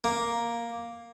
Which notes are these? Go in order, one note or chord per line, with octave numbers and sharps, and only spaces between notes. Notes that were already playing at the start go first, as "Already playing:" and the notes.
A#3